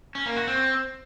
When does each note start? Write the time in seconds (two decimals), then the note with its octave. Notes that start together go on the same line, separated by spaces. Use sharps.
0.15 C#4
0.26 A#3
0.37 F#4
0.47 C4